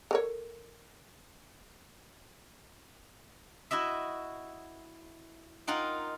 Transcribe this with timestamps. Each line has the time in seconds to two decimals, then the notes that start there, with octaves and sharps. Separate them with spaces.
0.11 A4 A#4 C#5
3.71 E4 F#4 D#5 E5
5.67 D#4 F4 A#4 F#5 G5